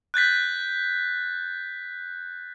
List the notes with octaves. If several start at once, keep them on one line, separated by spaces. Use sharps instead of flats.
F#6 G6 A6 B6